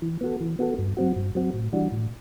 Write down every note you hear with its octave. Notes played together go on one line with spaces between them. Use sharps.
E3
B3 F#4 A4
E3
B3 F#4 A4
G2
F#3 C4 F#4
G2
F#3 C4 F#4
A2
E3 G3 D4 F#4
A2